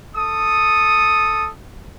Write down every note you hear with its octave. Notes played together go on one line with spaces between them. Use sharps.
A4 D#6